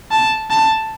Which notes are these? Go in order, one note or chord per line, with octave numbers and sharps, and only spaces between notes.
A5
A5